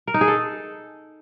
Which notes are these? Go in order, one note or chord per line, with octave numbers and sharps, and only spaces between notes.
A#4
D#4
G#4
A4